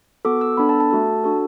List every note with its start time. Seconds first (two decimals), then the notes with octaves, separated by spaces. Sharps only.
0.25 B3 F#4 A4 D6
0.41 E6
0.57 B3 D4 A4 B5
0.69 A5
0.80 A5
0.91 A3 F#4 A4
1.24 D4 F#4 A4